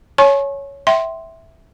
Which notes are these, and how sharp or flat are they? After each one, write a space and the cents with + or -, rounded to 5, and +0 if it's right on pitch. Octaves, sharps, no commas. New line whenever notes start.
C#5 +5 G#5 +40 C#6 -30
E5 -10 G5 -30 C6 +0